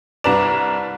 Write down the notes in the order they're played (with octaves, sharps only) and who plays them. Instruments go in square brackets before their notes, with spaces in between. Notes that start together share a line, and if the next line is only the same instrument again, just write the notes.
[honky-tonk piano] C2 A#5 E7 [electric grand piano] D4 B4 D5